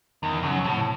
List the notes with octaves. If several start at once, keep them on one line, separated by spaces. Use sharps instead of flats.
E2 D#3
F#2 C#3
A2 C3